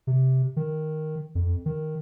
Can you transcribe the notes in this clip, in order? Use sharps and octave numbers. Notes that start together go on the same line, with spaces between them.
C3
D#3
F2
D#3